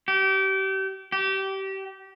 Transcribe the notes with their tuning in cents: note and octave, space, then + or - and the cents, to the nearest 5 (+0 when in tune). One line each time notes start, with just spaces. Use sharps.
G4 -30
G4 -25